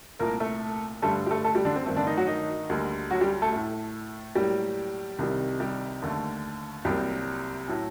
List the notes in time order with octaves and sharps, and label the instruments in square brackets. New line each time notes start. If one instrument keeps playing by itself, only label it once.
[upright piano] C2 A#2 A3 A#3 A#4
A3 A4
G2 D3 G3 A3 A4
G4
A3 A4
A3 A4
G3 G4
D3 D4
C4
G2 D#3 A3 C4
D3 D4
D#3 D#4
F#3 F#4
D#3 D#4
D2 D3 G3 A#3
F#3 F#4
G3 G4
A3 A4
A2 A3
A2 F#3 G3 A#3 G4
C2 C3 D#3 G3
G3 G4
D#2 D3 A3
C2 C3 F#3 G3 A#3 G4
A2 F#3 A3